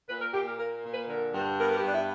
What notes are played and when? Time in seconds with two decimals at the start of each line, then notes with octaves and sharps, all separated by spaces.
0.09 A#2 B4
0.21 A#4
0.33 A#2 G4
0.45 A#4
0.59 A#3 A#4
0.83 A#2
0.92 B4
1.08 D3 A#4
1.33 G2
1.58 B3 A#4
1.69 A#4
1.75 G4
1.83 G2 D4
1.92 E4